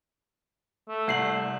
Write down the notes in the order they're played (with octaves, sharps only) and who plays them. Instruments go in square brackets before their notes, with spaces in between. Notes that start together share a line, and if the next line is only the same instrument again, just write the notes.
[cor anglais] A3
[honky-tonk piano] C2 C7 F#7